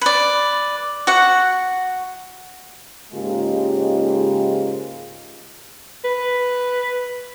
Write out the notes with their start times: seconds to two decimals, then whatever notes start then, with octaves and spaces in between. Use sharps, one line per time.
0.01 B4 D5
1.07 F#4 F#5
3.13 G#2 C#3 G#3 A#3 F4 G4
6.04 B4